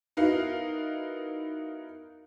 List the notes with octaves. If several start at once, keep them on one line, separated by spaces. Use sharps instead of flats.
B3 D#4 E4 F#4 A#4 F5